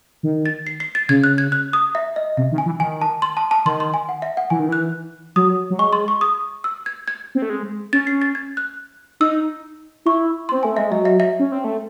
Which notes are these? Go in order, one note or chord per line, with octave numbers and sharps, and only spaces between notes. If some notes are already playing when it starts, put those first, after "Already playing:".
D#3
A6
C7
C7
A6
C#3 G#6
F#6
G#6
F#6
D#6
E5
D#5
C3 E5
D#3
G#5
E3
D#3 G#5
A5
C6
A5
A5
D#3 C6
C6
G#5
F#5
E5
F#5
E3 G#5
D#3
E3 F#6
F#3 D#6
F#3
G#3 C#6
C6
C#6
D#6
E6
G#6
G#6
C4
A3
G#3
C#4 A6
C7
A6
G#6
F#6
D#4 E6
E4 C#6
C4 C6
A3 G#5
G#3 E5
F#3 D#5
E5
E5
C#4
C4
A3